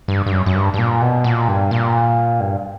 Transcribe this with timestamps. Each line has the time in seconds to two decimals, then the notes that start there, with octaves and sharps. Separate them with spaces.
0.08 G2
0.26 G2
0.32 F#2
0.46 F#2
0.55 G2
0.74 G2
0.78 A#2
1.02 B2
1.24 A#2
1.48 G2
1.71 A#2
2.40 G2